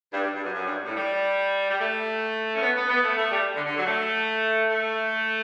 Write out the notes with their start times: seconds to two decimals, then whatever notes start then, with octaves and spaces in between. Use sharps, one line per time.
0.13 G2
0.23 G2
0.33 G2
0.44 F#2
0.54 F#2
0.65 G2
0.85 A2
0.96 G3
1.69 G3
1.79 A3
2.56 C#4
2.62 B3
2.76 B3
2.89 B3
3.03 A3
3.17 A3
3.31 G3
3.55 D3
3.66 D3
3.76 F#3
3.86 A3
4.70 A3